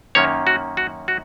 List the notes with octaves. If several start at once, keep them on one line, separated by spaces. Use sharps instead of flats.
F#2 D#3 A#3 C#4 C#5
F#4
F#4
F#4